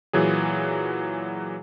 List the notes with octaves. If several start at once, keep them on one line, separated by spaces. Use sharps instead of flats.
A#2 E3 F#3 G#4